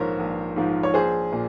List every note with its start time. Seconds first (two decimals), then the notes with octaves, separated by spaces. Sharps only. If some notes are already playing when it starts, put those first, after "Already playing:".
Already playing: A#1 G#2 F3 A#4 C5 C#5
0.19 A#1
0.56 G#2 F3
0.83 C#5
0.94 A#1 G#4 C5
1.32 A#2